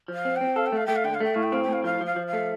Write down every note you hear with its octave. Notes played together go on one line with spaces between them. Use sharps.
F3
F5
C4
G5
C4
A4 F5
G5
A3 F5
A3 G5
F5
D3 G5
F5
A3 G5
A2 F5
G5
C4 F5
G5
A2 F5
F3 F5
F3 F5
F3
F5
A3